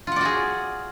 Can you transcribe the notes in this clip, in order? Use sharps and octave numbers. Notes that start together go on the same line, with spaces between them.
F4 F#4 G#4 D5 F#5